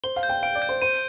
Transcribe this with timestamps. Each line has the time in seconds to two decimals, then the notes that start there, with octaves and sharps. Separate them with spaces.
0.04 C5 G7
0.16 F5
0.23 G6
0.29 G5
0.43 F5 D7
0.55 D5
0.62 G6
0.69 C5
0.82 C5 D#7